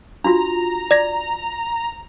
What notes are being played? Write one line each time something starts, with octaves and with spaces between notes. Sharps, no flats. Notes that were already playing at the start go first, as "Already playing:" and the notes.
D4 F4 F#4 A#5
D5 G#6 A#6